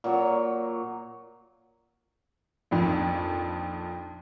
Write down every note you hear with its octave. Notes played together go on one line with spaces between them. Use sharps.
A#2 F#3 C#5
A#1 F2 D#3